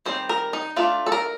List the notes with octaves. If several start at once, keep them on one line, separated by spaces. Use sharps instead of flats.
D#3 G3 C4 C5
A#4
D#4
A3 D4 F4
A4
A#4